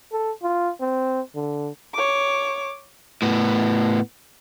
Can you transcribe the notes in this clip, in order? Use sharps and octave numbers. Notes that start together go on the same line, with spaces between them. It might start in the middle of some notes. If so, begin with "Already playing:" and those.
A4
F4
C4
D3
C#5 D6
A2 B3